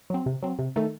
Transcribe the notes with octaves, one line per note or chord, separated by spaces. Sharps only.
F#3 C4
C3
F#3 C4
C3
D#3 A3 D#4 A4